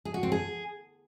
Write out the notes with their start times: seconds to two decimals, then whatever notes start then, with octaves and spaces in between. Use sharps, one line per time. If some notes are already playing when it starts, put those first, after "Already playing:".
0.05 G#4
0.14 F#4
0.23 C4
0.32 G#4